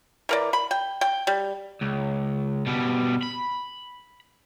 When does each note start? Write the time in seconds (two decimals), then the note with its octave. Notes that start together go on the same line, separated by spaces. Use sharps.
0.29 E3 A#4 D5
0.53 B5
0.71 G5
1.01 G5
1.27 G3
1.82 C#2
2.67 B2 G3
3.23 B5